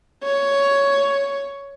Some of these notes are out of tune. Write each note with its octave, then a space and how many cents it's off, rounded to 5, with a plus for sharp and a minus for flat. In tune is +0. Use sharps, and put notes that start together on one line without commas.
C#5 +10